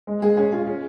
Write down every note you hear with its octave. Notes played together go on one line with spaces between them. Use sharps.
G#3
G#3 G#4
C#4 G#4
F4 G#4
C#4